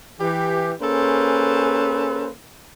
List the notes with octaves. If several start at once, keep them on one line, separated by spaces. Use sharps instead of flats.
E3 G4
A#3 C#4 G#4 A4 B4 C5